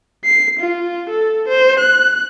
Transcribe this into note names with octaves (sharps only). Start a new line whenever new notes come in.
C7
F4
A4
C5
F#6